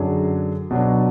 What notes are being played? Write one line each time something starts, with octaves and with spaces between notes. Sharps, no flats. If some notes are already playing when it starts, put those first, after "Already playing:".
Already playing: F#2 D3 F#3 D4 G#4
B2 F#3 D4